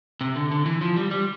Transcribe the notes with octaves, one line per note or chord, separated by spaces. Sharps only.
C3
D3
D3
E3
F3
G3
G3